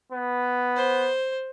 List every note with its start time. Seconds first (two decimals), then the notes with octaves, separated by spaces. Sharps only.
0.12 B3
0.76 C5